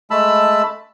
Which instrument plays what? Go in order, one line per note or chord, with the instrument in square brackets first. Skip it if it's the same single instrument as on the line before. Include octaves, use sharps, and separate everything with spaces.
[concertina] G#3 A3 A5 B5 E6